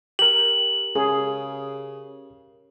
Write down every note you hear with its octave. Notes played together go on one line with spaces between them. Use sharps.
G4 A#4 F#7
C#3 G#4